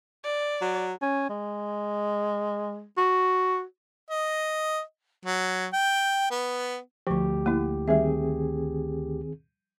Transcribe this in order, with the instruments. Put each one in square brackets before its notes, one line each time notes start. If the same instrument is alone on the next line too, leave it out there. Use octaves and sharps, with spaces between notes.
[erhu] D5
[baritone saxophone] F#3
[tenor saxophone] C#4
G#3
F#4
[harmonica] D#5
F#3
G5
B3
[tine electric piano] D2 G4 [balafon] F3 C#6
[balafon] A#3 E4
[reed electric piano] D#3 C4 G#4 [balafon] G3 E5